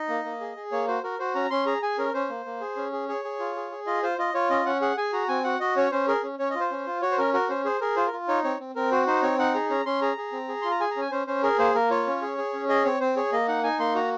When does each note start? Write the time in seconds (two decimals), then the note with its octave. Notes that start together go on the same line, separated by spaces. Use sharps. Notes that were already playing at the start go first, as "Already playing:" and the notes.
Already playing: D#4 D#5
0.09 A#3
0.25 A#3
0.40 G#4
0.56 G#4
0.72 A#3 C#5
0.88 F#4 C5
1.03 F#4 A#4
1.19 F#4 C5
1.35 C#4 A#5
1.51 C#4 C6
1.66 G#4 A#5
1.82 G#4 G#5
1.98 C#4 A#4
2.14 C#4 C5
2.30 A#3
2.45 A#3
2.61 G#4
2.76 C#4
2.92 G#4
3.09 G#4 C#5
3.25 G#4
3.39 F4
3.56 G#4
3.71 G#4
3.87 F4 D#5
4.03 F4 C5
4.18 F4 D#5
4.34 F4 C#5
4.50 C#4 D#5
4.66 C#4 F#5
4.81 G#4 F#5
4.97 G#4 G#5
5.13 F#4 A#5
5.28 C4 G#5
5.44 F#4 F#5
5.60 F#4 D#5
5.76 C#4 C#5
5.92 C#4 C5
6.07 G#4 A#4
6.23 C#4
6.39 C#4 C#5
6.50 D#5
6.55 F4 C5
6.71 C#4
6.86 F4
7.02 F#4 C#5
7.11 C5
7.18 C#4 A#4
7.34 F#4 A#4
7.49 C#4 C5
7.65 G#4 C5
7.81 G#4 A#4
7.96 F4 C5
8.07 A#4
8.13 F4
8.28 D#4 C#5
8.44 C4 C#5
8.60 C4
8.75 C4 A#4
8.91 F#4 C5
9.07 D#4 C5
9.22 C4 C#5
9.39 D#4 F#5
9.54 G#4 A#5
9.70 C#4 A#5
9.86 C#4 C6
10.01 G#4 A#5
10.17 G#4
10.32 C4
10.49 G#4
10.62 F4 C6
10.71 A#5
10.80 G#4 G#5
10.91 A#5
10.97 C#4 G#5
11.11 C#4 C5
11.27 C#4 C5
11.43 G#4 A#4
11.59 A#3 C5
11.74 A#3 A#4
11.91 F4 C#5
12.07 C#4
12.22 G#4
12.38 G#4
12.54 C#4
12.69 G#4 D#5
12.85 C4 C#5
13.00 C4 C5
13.16 G#4 C#5
13.32 A#3 D#5
13.48 D#4 F#5
13.64 D#4 G#5
13.79 A#3 C6
13.95 F#4 A#5